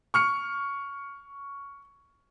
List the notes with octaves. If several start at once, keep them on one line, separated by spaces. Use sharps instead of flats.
C#6 F6 C#7